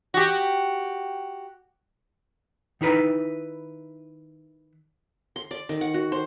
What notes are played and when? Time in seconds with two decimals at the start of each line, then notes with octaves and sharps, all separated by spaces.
0.14 F#4 G4
2.81 D#3 D#4 E4 B4 A#5
5.36 C6
5.51 D5
5.69 D#3
5.81 F#5
5.94 F#4
6.12 C5